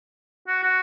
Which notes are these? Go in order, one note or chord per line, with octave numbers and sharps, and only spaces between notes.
F#4
F#4